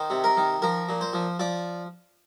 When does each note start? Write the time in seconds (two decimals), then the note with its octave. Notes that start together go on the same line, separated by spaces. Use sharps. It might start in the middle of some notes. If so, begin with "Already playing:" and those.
Already playing: D#3 C5
0.10 C3
0.24 A#4
0.37 D#3
0.62 F3 A#4
0.89 A#2
1.01 C5
1.13 F3
1.39 F3 D5